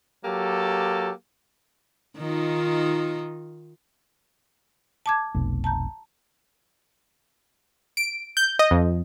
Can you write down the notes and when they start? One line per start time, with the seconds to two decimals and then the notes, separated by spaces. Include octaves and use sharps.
0.25 F#3 A#3 G4 A4
2.18 D#3 D#4 F4
5.06 A5 D6 G#6
5.34 F1 B1
5.64 A5 A#5 G6
7.97 D7
8.37 G6
8.59 D#5
8.71 F2